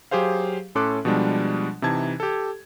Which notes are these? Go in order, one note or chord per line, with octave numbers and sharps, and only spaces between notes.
F#3 G4 G#4 C5 F5
A2 C#4 A4 C6 D6 F#6
B2 F3 G3 G#3 D4
C3 E3 D#4 A5 G#6
G4 A4